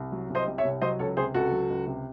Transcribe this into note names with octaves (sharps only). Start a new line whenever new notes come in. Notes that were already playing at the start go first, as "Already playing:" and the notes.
Already playing: C2
F#3
C2
C5 D#5
C3
C#5 E5
C2
F#3 C5 D#5
C#2 A4 C#5
C3 G#4 C5
C#2 F#4 A4
F#3
C#2
C3